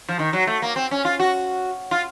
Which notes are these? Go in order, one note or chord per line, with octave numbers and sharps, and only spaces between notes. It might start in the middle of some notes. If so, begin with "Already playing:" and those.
F3
D#3
F#3
A3
A#3
C4
C#4
F4
F#4
F4